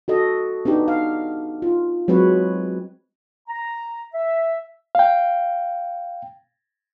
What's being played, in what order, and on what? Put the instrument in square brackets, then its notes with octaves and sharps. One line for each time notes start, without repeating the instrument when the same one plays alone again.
[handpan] F#4 A4 D#5
B3 D4 D#4 G4
F5
F4
F#3 G#3 C4 B4 C#5
[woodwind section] A#5
E5
[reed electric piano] F5 G5